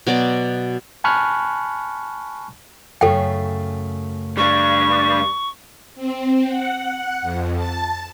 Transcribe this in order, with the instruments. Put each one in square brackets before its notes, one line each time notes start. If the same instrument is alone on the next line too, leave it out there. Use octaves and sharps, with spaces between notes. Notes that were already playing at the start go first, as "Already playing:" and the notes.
[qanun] B2 F#3 D5 D6
[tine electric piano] G#5 A5 B5 C#6 F6 F#6
[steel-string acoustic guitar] F#2 C#3 A3 [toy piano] A4 G5
[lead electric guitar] G3 D4 [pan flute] C#6
[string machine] C4
F#5
F2
A5